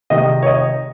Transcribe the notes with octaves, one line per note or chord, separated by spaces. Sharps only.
C2 C3 D#3 G#3 D#5
C#5
D#5